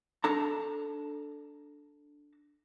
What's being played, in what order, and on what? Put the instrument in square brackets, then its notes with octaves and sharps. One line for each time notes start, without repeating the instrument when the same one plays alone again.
[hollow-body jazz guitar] D4 A4 A5 A#5